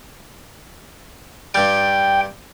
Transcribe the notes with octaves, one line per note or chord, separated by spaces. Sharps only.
G2 G3 G5